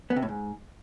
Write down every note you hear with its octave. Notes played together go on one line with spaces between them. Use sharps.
B3
C3
A2
G#2